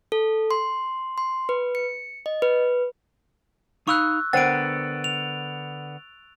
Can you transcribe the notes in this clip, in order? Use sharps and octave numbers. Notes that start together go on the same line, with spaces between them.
A4
C6
C6
B4
C#7
D#5
B4
D#4 F5 B5 C#6 E6 F#6
D3 B3 A#4 C5 F#5 G5 A6 D7
F7